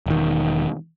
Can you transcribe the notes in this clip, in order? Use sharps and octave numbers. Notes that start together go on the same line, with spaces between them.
E1 D#3